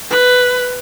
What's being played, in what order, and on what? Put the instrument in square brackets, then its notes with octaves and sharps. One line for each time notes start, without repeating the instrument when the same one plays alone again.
[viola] B4